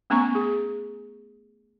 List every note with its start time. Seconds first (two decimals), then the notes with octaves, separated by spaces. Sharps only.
0.10 A3 B3 C#4 G#5 A#5 C#6
0.35 G#4